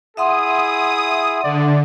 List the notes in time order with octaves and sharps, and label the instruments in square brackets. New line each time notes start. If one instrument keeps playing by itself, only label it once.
[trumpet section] E4 G#4 [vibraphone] E5 F#5 C6 [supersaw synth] D#6
[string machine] D3 [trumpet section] D5